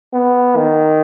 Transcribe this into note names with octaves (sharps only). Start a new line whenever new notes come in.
B3
D#3